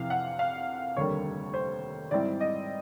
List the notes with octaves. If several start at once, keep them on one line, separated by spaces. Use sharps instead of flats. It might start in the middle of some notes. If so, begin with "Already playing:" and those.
Already playing: F2 C3 E3 F5
F#5
F5
F1 D#2 D3 G3 A#3 C#5
C5
G#2 E3 G3 C4 E4 D5
D#5